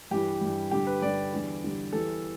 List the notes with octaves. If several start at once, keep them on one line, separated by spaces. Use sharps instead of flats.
G2 E3 G3 G4
G2 E3 G3
G2 D3 G3 G4
B4
G2 D3 G3 D5
E2 D3 G3
E2 D3 G3
E2 E3 G3 A4